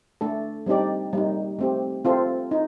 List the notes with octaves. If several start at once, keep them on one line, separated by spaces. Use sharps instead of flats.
A3 D4 A4
G3 C4 D#4 G4 D5
G3 A#3 D#4
A3 C4 G4
C4 F4 A4
D#4